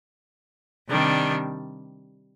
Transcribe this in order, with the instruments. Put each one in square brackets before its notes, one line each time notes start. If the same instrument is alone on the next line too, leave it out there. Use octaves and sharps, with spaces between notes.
[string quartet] C3 D#3 G3 D4